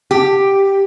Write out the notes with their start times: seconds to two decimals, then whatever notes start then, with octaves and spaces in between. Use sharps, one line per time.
0.11 G4